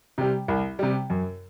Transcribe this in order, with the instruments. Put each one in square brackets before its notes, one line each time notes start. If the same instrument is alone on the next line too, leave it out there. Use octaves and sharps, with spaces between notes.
[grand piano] C3 G3
C2
C3 G3
F#2